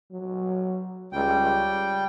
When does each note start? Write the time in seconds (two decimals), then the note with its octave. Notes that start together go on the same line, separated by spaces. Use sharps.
0.11 F#3
1.12 C#2 G3 G5